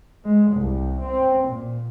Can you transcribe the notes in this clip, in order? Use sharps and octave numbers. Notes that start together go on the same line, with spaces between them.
G#3
C2
C4
A#2